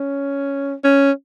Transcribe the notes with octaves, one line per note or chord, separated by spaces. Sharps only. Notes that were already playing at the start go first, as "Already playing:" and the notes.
Already playing: C#4
C#4